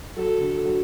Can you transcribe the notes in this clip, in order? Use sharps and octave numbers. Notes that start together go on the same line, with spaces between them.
F#3 A4
D3
F#3